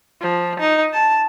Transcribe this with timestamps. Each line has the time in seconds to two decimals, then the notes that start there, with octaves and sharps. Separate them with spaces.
0.21 F3
0.60 D#4
0.93 A5